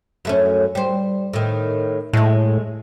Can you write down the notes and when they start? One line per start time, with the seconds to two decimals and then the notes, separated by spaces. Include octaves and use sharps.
0.25 F#2 A3 C#4
0.75 G3 C5
1.33 A2 D#3
2.13 A2 G#3 A3